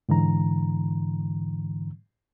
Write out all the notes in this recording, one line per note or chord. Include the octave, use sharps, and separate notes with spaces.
G#2 D3 E3 A#5